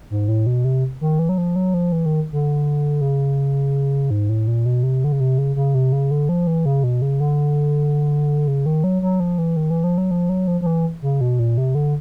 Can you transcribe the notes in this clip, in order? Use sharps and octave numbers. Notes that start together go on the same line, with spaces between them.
G#2
A2
B2
C3
D#3
E3
F#3
F3
F#3
F3
E3
D#3
D3
C#3
G#2
A2
A#2
B2
C3
D3
C#3
C3
C#3
C#3
C3
C#3
D3
F3
E3
C#3
B2
C#3
D3
C#3
D#3
F#3
F#3
F3
E3
D#3
E3
F3
F#3
F3
F#3
F3
F3
E3
C#3
B2
A#2
C3
D3